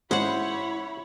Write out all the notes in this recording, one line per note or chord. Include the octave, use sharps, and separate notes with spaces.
G#2 G#3 C#4 E4 C5 C#5 F#5 B5